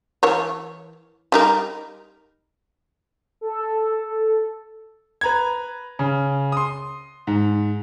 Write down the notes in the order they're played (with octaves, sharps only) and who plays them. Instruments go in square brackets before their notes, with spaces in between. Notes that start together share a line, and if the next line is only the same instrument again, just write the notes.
[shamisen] E3 A#4 C#5
G3 D#4 A#4
[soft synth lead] A4
[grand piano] B4 A#5 G#6
C#3
C6 D#6
G#2